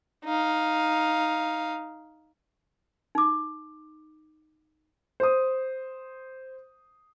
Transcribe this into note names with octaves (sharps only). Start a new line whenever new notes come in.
D#4 F5
D#4 D6
C5 D#6